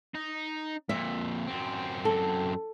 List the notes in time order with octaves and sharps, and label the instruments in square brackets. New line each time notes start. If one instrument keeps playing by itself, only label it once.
[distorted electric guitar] D#4
[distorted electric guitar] F2 A#2 [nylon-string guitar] E5
[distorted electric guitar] F#2 C4
[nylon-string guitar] A4